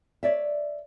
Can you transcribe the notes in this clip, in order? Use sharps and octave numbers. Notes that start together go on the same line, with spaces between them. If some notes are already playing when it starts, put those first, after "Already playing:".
C#5 D5 E5